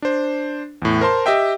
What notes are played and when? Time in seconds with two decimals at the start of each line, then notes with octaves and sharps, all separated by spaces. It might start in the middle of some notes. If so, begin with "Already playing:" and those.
0.02 D4 C5
0.82 E2 A2
1.01 A#4 C5 A5 C6
1.26 G4 D#5 E5 G5